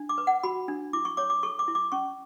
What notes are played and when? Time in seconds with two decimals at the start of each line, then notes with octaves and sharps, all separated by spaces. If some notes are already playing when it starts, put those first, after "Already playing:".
Already playing: D4
0.09 D6
0.18 B4
0.27 F#5
0.43 F#4 B5
0.68 D4
0.93 E4 D6
1.05 C#6
1.17 C#5 D6
1.30 D6
1.43 A4 C#6
1.59 D6
1.68 E4
1.75 D6
1.92 C#4 C#6